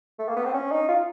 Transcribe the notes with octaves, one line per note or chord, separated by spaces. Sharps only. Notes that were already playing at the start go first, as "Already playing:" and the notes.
A3
A#3
B3
C4
C#4
D#4
F4